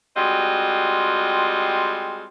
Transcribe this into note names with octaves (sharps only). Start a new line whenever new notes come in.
G3 G#3 C4 F4 F#4 D#5